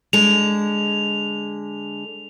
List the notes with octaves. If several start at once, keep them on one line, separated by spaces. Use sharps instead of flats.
D3 G#3 F7